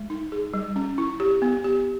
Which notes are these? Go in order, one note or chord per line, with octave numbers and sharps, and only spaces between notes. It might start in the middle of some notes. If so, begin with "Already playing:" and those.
Already playing: G#3
D#4
G#4
G3
C#4
E4
G4
B3
G4